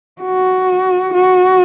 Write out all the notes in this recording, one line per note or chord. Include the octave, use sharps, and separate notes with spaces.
F#4
F#4